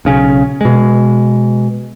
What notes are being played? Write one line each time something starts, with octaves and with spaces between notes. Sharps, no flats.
B1 C#3 C#4
B2 G#3